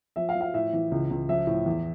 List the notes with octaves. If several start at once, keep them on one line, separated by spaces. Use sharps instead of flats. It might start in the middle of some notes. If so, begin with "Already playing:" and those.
F3 E5
F5
F3
F5
A2 E5
E3
C#2
C#2
F3 E5
A2
E2